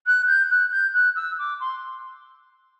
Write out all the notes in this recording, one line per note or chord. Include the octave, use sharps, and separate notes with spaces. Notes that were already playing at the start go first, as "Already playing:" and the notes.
F#6
G6
F#6
G6
F#6
E6
D6
C6